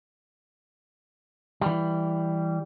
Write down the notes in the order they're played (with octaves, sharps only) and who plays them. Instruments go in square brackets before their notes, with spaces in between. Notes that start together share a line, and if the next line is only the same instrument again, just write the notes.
[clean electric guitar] E3 G3